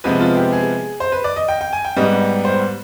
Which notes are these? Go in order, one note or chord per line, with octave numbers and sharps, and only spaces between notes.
C3 F3 G#3 B3 B4
F4
G4
G#4
C5
B4
D5
D#5
G5
G5
G#5
G5
G#2 G3 B3 D#5
C5